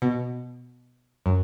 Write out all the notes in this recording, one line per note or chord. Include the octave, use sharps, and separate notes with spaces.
B2
F#2